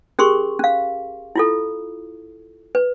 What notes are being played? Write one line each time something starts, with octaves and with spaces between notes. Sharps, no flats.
C#4 G4 G#4 A#4 C6 C#6
C#4 F5
E4 F4 A4
B4